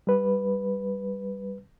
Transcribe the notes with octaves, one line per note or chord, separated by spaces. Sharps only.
G3 B4